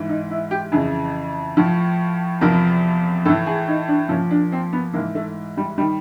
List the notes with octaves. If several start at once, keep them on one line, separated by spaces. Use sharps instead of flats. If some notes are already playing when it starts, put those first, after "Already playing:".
Already playing: G#2 E3
D#4
E4
G4
F2 C#3 E3 G#4
A2 F3
E2 C3 F3 A#4
A2 E3 A4
G#4
D#4
D4
A#2 F3 C#4
D4
C4
B3
G#2 E3 A#3
A3
G3
D#3 G3